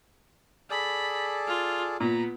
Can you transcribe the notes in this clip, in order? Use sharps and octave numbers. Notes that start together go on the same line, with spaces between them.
G#4 A4 D5 B5
F4
A#2 B3 A#5